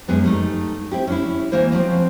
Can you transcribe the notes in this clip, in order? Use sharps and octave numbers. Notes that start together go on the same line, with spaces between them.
F#2 G#3 B3 D#4
G3 A3 D#4
C4 E4 G4
C#4 D4 E4
E3 A#3 E4 C5 D#5
F3 F#3 C4